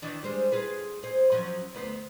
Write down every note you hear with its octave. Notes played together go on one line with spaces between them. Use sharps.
D#3 E3 D4
G3 G#3 C5
F4 G#4 B4
G#4 C5
F3 F#3 C#4
D2 B3 C5